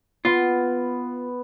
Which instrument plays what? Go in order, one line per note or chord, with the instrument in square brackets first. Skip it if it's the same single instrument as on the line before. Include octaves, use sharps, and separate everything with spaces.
[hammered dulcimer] B3 [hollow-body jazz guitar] F4